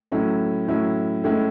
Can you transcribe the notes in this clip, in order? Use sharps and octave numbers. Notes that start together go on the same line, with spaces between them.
A2 F#3 C#4 E4
A2 F#3 C#4 E4
A2 G#3 C#4 E4